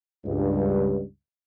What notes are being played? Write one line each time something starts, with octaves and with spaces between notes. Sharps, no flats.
C#2 G2